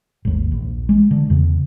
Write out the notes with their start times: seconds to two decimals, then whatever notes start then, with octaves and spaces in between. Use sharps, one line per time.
0.25 G#1 D#2
0.52 A#1
0.89 G#3
1.11 D3
1.30 E2 C#3